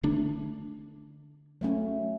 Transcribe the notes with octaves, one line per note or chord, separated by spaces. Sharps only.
D3 A3 D4
F#3 A3 C#4